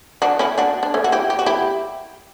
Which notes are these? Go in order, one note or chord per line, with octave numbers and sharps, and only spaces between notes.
D4 F#4
C#4 E4
D4 F#4
D4
A3 C#4
F#4
E4 G4
G4
F#4
E4 G4